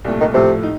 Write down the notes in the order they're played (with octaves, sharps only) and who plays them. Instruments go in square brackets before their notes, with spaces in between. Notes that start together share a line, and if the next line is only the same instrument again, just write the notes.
[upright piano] C2 A#2 A3
[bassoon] D#3
[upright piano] A2 F3 A3 [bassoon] C3
[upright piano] D#4